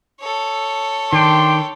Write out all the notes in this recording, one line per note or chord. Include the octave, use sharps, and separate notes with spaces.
A4 C#5
D#3 D4 G5 C6